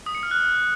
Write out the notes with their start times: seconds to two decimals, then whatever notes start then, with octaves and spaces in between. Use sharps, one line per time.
0.06 D#6
0.15 C#7
0.23 F6
0.31 F#6